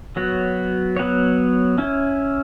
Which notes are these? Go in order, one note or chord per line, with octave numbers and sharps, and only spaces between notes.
F#3 B3 F#4 C#5
F#3 B3 F#4 C#5
C#4 E4